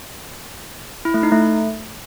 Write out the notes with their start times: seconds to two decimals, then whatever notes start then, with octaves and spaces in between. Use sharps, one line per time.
1.05 E4
1.14 A3
1.23 D#4
1.32 A3